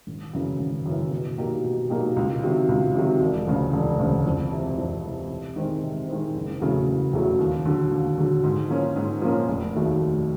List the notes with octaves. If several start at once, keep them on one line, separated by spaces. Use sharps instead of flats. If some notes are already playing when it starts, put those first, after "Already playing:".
G#1
F#2 C#3 E3
G#1
F#2 C#3 E3
B2
F#3 A#3 D#4 G4
B2
F#3 A#3 D#4 G4
C#2
C3 D#3 F#3
C#2
C3 D#3 F#3
E1
D2 C#3
E1
D2 C#3
F2
C3 E3
F2
C3 E3
C3
D#3 G#3 C4
C3
D#3 G#3 C4
F#1
E2 C#3 F#3 A3
F#1
E2 C#3 F#3 A3
D#2
D3 F#3
D#2
D3 F#3
G#2
F3 A#3 C#4
G#2
F3 A#3 C#4
F1
D#2 D#3 F#3 A3
F1